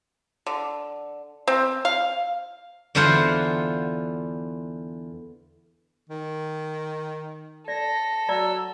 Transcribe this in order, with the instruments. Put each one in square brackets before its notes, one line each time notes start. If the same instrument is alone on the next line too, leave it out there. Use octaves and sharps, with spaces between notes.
[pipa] D3
C4
F5
[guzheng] E2 D3 E4 F4 C5 F#5
[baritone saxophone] D#3
[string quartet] A4 [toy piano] D5 [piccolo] A#6
[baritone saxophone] F#3 [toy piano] D5 A#5 [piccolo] E6